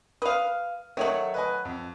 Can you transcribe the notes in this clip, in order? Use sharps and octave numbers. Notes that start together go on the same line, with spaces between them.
B4 F5 D#6
D#3 F#3 A3 C#5 F#5
B4 D#5 G#5
F2